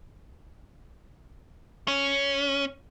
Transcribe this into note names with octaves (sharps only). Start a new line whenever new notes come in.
C#4